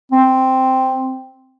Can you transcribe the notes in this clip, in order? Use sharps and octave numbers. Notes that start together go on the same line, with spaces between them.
C4